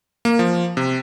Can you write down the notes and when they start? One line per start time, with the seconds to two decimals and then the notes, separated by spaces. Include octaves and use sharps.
0.25 A#3
0.39 F3
0.77 C3